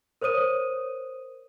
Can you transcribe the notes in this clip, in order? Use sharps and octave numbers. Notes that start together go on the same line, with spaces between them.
A#4 C5 C#5 D#6 D#7